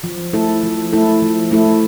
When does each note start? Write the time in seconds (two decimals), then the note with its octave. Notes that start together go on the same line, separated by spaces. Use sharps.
0.04 F3
0.33 A3 E4 A4
0.63 F3
0.92 A3 E4 A4
1.22 F3
1.52 A3 E4 A4